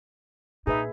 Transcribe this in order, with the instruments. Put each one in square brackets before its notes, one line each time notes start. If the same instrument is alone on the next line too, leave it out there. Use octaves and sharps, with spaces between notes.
[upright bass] A#2 [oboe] D#4 [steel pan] G#4 B4 E5